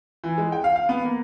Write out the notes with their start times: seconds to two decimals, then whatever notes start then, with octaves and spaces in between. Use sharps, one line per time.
0.24 E3
0.38 G#3
0.52 G5
0.64 F5
0.76 F5
0.89 B3
1.05 A#3